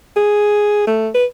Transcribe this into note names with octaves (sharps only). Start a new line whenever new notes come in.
G#4
A3
B4